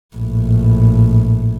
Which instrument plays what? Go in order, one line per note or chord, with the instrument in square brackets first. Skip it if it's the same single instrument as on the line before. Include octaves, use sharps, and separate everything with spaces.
[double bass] A#1 A2